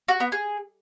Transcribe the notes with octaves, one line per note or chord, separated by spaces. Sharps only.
F#4
B3
G#4